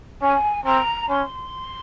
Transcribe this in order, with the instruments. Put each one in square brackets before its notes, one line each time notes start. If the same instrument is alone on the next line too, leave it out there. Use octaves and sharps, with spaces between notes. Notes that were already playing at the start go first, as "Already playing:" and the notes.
[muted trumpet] C#4 [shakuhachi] G#5
[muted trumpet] C4 [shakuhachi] A#5
[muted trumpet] C#4 [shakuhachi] C6